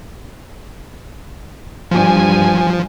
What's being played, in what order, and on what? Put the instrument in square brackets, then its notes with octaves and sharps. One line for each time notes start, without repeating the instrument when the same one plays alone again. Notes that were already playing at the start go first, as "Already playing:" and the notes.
[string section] G2 G#5 [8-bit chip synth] F3